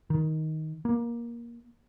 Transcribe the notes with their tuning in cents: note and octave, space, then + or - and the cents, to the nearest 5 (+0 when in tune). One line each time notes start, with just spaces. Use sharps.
D#3 +10
A#3 +15